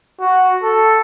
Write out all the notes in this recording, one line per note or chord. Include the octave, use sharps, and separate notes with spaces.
F#4
A4